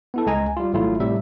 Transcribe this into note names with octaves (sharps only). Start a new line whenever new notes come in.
B3 E4 A4
C#2 G#3 D#5 G#5 A#5
G3 F4
G#1 F#3 A3 E4 F4
A2 C3 G3 E5